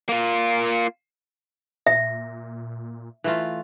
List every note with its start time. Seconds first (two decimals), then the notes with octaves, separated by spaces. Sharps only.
0.09 A#3 F4
1.87 A#2 E5
3.24 E3 A3 F4